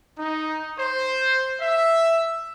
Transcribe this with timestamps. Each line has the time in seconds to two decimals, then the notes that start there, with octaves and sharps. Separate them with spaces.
0.17 D#4
0.77 C5
1.60 E5